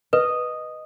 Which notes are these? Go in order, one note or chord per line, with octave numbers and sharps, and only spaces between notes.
B4 D#5